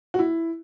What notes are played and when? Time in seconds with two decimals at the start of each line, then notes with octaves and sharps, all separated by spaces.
0.14 F#4
0.19 E4